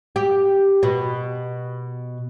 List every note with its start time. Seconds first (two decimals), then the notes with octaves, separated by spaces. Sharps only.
0.16 G4
0.83 B2